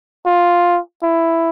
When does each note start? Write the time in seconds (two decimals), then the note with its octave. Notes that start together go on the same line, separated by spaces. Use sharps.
0.26 F4
1.03 E4